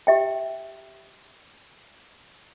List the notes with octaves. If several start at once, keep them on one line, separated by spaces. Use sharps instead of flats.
G4 E5 G5